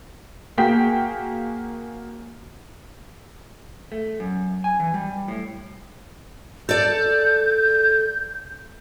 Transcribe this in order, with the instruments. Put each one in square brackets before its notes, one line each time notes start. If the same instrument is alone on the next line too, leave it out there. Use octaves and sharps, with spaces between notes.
[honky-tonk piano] A#3 F#4 G#4 G5 B6
[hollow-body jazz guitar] A3
F#2
G#5
E3
G3
A2
[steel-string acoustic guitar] A4 D5 [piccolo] G6